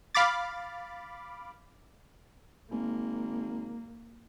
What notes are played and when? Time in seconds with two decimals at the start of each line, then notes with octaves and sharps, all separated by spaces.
0.15 F5 B5 D6 A6
2.71 G#1 A#3